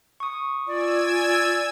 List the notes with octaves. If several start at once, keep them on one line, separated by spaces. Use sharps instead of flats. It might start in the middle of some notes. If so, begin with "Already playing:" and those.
C#6 D#6
F4 D5 G#5 E6 G#6